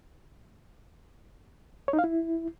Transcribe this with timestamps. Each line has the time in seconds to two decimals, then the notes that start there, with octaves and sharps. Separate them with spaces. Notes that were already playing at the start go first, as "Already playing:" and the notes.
1.88 C#5
1.93 D#4
1.99 F5
2.04 E4